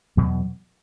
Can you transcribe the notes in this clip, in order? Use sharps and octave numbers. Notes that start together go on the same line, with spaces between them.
E2 B2 F#3